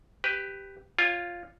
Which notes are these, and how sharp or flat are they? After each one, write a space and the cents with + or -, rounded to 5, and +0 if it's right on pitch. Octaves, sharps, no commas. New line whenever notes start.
G4 +0 B4 +10
F4 +0 C#5 +0 G#5 -45